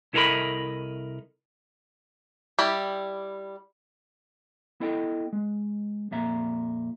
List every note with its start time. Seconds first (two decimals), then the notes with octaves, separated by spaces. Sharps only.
0.13 C2 E4 A4 A#4 D#5 B5
2.59 G3 E4 G4
4.80 B3 E4 A4 D#5 G5
5.33 G#3
6.11 F2 A#2 E5 A#5